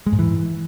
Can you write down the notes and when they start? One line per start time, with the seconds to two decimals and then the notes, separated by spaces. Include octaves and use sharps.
0.07 G#3
0.13 G#2
0.19 E3